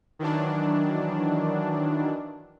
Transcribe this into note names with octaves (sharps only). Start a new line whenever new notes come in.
D#3 E3 F#3 D4